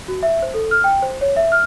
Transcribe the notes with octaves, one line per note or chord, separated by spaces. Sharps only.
F#4
E5
C5
A4
F6
G5
C5
C#5
E5
F6